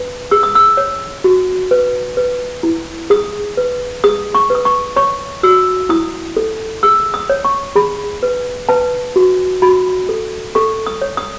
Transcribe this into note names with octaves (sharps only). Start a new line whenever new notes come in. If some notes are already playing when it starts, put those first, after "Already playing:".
Already playing: B4
G#4 E6
D#6
E6
C#5
F#4
B4
B4
E4
G#4 D#6
B4
G#4 D#6
C#6
B4
D#6
C#6
C#5 C#6
F#4 E6
E4 D#6
A4
G#4 E6
D#6
C#5
C#6
G#4 B5
B4
B4 A5
F#4
F#4 B5
A4
A4 C#6
D#6
C#5
D#6